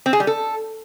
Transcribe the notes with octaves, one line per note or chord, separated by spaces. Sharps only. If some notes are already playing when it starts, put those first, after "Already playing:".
C4
G#4
G3
A4